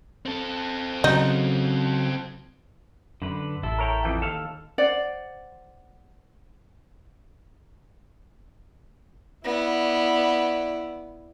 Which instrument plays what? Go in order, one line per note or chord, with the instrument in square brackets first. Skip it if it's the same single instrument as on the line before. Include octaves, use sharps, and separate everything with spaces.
[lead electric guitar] C4 A4
[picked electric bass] C#3 F#3 [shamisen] D#4
[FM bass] F#2 [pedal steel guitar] D3 B4
[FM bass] A1 [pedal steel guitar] E4 A4
[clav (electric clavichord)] A#4 C#5 G5
F2 E3 G5
D#2 A4 F5
[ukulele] C5 D5 F#5
[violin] B3 [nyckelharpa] E4 D5